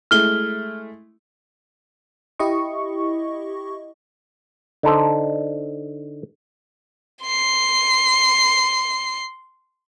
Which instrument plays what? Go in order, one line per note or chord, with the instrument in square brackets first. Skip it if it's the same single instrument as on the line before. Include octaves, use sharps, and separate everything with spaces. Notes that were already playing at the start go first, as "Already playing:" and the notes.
[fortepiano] G#3 A3 E4 [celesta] F6 G7
[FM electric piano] E4 G4 D#5 C#6
[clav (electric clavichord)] D3 D#4 A4 C5
[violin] C6 C7